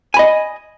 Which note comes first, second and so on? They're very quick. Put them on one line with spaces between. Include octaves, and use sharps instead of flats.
G#5 B5 D#5